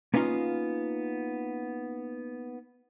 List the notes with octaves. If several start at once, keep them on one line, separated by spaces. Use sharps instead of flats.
A#3 B3 C#4 D#4 F4